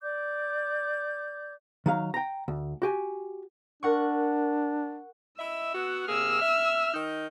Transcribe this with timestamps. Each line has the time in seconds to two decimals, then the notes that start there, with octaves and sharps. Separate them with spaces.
0.01 D5 D6 G6
1.86 D#3 F#3 F5
2.14 G5 A#5
2.48 D2
2.82 F#4 G4 G#5
3.83 D4 A#4 F#5 C#6
5.39 E4 D#5 E5 E6
5.73 B3 F#4
6.08 C3 A#3 G#4 E6 F6
6.42 E5
6.94 D#3 D#4